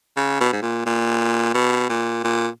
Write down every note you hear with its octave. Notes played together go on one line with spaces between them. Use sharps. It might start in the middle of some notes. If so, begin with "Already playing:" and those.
C#3
B2
G#2
A#2
A#2
B2
A#2
A#2